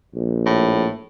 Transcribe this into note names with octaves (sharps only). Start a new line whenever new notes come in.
A#1
A2